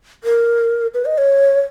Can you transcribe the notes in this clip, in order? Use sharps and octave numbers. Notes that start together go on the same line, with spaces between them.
A#4
B4
D#5
C#5